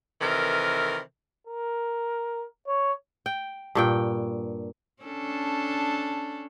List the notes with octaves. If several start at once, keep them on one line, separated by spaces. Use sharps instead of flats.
C3 D#3 E3 A4 A#4
A#4
C#5
G5
G2 A#2 G5
C#4 D4 A4